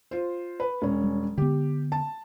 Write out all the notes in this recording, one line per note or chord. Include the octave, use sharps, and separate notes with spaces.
F4 C5
B4
E1 C#4
G3
D3 B3 G4
A5